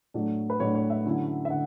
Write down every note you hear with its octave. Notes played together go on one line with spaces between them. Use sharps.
A2 F#3 A3 D4
B4
A2 F#3 A3 D4 C#5
C#5
E5
D3 F#3 C#4 E4
E5
D3 F#5